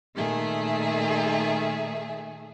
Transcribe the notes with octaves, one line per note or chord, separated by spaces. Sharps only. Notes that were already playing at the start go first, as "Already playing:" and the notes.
A#2 D#3 A3 G#4 E5